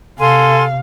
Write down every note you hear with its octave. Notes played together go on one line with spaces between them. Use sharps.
C3 A4 F5 G#5 C6